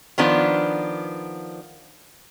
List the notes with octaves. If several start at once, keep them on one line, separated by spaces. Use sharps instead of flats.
D#3 F3 B3 D4